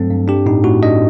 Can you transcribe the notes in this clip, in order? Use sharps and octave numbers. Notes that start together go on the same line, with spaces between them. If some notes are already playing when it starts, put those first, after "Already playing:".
Already playing: G2 F#3 A3 C4 A4
G2
D4 G4
A2 D#4
A2 F#4
D4 D#5